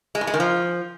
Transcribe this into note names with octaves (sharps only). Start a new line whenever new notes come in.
G#3
A2
G#3
D#3
F3